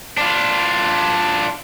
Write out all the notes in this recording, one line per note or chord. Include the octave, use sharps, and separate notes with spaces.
D4 F4